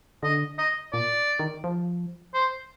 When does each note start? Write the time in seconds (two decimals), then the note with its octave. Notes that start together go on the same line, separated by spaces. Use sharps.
0.23 D3 D#5
0.58 D#5
0.93 A#2 D5
1.39 D#3
1.64 F3
2.34 C5